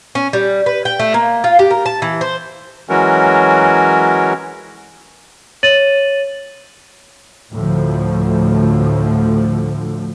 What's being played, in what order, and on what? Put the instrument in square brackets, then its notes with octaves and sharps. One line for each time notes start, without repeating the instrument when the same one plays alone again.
[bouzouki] C#4
G3
B4
G5
A3
A#3
F4
G4
A#4
A5
E3
C5
[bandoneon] E3 F#3 G#3 C#4 F#4 A#4
[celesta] C#5 A6 D#7 F#7
[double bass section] D2 A2 D3 F3